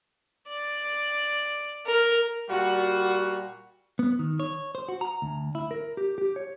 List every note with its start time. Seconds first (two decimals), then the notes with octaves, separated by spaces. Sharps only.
0.49 D5
1.86 A#4
2.50 A#2 G3 F4 F#4
3.99 B3
4.19 D#3
4.40 C#5
4.75 C5
4.88 F#4
5.01 A#5
5.22 D2
5.55 E4
5.71 A#4
5.97 G4
6.18 G4
6.36 C#5